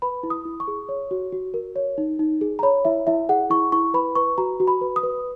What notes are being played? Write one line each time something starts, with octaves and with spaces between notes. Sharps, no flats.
B4 B5
E4
D#6
E4
C#6
G#4
C#5
F#4
F#4
A#4
C#5
D#4
D#4
G#4
A#5
C#5 B5
E4 E5
E4 E5
G#4 F#5
E4 C#6
E4 C#6
B4 B5
B4 C#6
F#4 A#5
F#4
B5
B4
D#6
B4